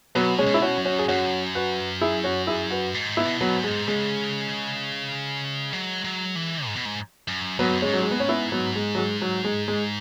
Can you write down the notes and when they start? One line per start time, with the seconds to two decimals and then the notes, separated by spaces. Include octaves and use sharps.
0.15 B2 F#3 B3
0.39 G#3 C#4
0.46 B2
0.54 E4
0.62 C#4 F#4
0.78 F#2
0.85 C#4 F#4
0.99 G#4
1.08 F#2 C#4 F#4
1.55 F#4 B4
2.01 E4 G#4
2.24 C#4 F#4
2.47 E4 G#4
2.70 F#4 B4
2.94 G#2
3.17 B3 E4
3.25 B2
3.41 F#3 B3
3.56 G#2
3.64 G#3
3.87 C#3 G#3
5.73 F#3
6.05 F#3
6.36 E3
6.66 G#2
6.76 B2
6.86 G#2
7.28 F#2
7.59 G#2 F#3 B3
7.72 F#2
7.82 G#2 G#3 C#4
7.94 F#3
8.02 G#3
8.11 B3
8.20 C#4
8.28 B3 E4
8.52 F#3 B3
8.76 G#3
8.95 F#3
8.98 G#3
9.22 F#3
9.45 G#3
9.68 G#3